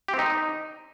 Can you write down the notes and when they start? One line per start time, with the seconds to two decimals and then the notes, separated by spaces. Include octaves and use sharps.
0.08 G4
0.14 C4
0.19 D#4